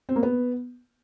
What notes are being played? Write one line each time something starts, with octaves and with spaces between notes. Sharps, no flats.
C4
A#3
B3